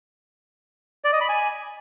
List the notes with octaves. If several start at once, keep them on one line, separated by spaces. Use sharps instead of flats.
D5
D#5
B5
G#5